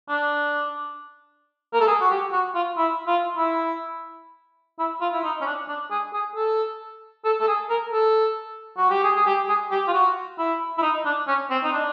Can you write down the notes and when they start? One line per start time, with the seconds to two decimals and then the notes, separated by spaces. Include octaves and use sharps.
0.09 D4
1.74 A#4
1.81 A4
1.88 G#4
2.01 F#4
2.11 G4
2.33 F#4
2.55 F4
2.78 E4
3.07 F4
3.37 E4
4.79 E4
5.01 F4
5.13 E4
5.24 D#4
5.41 C#4
5.46 D4
5.68 D4
5.91 G#4
6.13 G#4
6.36 A4
7.25 A4
7.41 A4
7.48 G#4
7.70 A#4
7.92 A4
8.77 F#4
8.91 G4
9.04 G#4
9.16 G#4
9.26 G4
9.49 G#4
9.71 G4
9.88 F4
9.93 F#4
10.39 E4
10.78 E4
10.83 D#4
11.06 D4
11.27 C#4
11.50 C4
11.64 D#4
11.73 D4